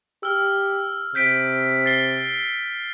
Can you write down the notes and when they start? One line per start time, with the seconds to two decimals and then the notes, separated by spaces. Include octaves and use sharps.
0.23 G4 E6 F6
1.15 C3 G6 B6 D7
1.86 A6 C7 G7